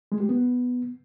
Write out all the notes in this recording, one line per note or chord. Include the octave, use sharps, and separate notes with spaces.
G#3
G4
B3